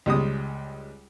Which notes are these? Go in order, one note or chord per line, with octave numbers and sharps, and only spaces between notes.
C#2 G3 G#3 D#6